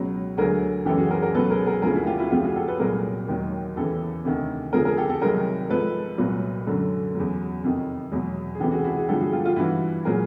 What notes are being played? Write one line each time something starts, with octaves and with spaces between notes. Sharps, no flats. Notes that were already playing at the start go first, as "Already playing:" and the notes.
Already playing: C#2 B2 F#3
D2 D3 F#3 G#4 A#4
F#2 C#3 E3 G4 A4
F#4 G#4
G#4 A#4
G#4 A#4
C#2 B2 F#3 A4 B4
G#4 A#4
G#4 A#4
D2 C#3 F3 G#4 A#4
E4 F#4
F4 G4
E4 F#4
F2 C#3 F3 F4 G4
F#4 G#4
G4 A4
A4 B4
C2 A#2 F#3 G#4 A#4
D#2 D#3 F#3
E2 C#3 E3 G4 A4
D2 C3 D#3
F2 D3 F3 G#4 A#4
G#4 A#4
G4 A4
G4 A4
C2 C3 D#3 F#3 G#4 A#4
G#2 F3 A4 B4
C2 A#2 F#3
F#2 D3 F#3
E2 C#3 F#3
F2 C3 D#3
E2 B2 F#3
G#4
C#2 C3 E3 G4 A4
F#4 G#4
E4 F#4
F#4 G#4
G2 D3 F3 G4 A4
F#4 G#4
F4 G4
F4 G4
G2 E3 E4 F#4
A#2 F#3 G#4 A#4